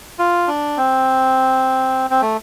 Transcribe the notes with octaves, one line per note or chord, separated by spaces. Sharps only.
F4
D4
C4
C4
A3